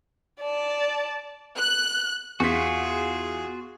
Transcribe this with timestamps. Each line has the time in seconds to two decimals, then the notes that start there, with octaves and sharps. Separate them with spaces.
0.41 D5 A5
1.57 F#6
2.40 E2 F4 F#4 G#4 B6